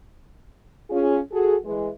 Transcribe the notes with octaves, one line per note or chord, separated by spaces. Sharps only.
C#4 F4 G#4
F#4 G#4 A4
E3 G#3